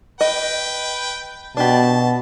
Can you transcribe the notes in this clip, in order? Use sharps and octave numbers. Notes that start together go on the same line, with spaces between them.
B4 D#5 G5
B2 D4 G4 A5